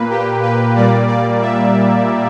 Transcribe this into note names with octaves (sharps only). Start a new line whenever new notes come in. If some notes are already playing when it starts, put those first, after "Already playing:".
Already playing: A#2 A#3 B4
G4
B4
A#2 G3 A#3 D5
D5
E5